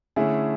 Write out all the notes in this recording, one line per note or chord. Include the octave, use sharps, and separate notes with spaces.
D3 A3 C#4 E4 G#4